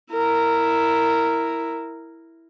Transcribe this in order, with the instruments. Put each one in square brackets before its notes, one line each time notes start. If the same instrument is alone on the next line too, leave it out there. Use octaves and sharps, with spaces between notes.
[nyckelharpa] E4 A#4